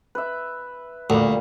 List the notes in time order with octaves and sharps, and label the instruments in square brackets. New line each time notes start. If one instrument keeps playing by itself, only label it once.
[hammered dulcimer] B4 E5
[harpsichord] D2 [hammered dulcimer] A#2 G3